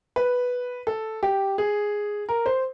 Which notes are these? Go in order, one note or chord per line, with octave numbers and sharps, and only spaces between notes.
B4
A4
G4
G#4
A#4
C5